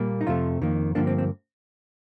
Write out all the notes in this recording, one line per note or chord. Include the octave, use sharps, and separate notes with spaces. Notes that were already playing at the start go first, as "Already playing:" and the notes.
Already playing: A#2 G3 A#3
D#4
F2 C3 F3 A3 F4
F2 D#3 A#3
G2 D3 F3 A#3 D4
C4
C4